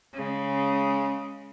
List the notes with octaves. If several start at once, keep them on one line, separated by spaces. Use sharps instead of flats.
C#3 G#3